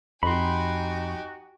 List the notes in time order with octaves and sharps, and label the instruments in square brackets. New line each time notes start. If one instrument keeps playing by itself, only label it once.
[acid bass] F2 [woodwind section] D#4 F#4 [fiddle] G4 G#5 [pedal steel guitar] B5 C6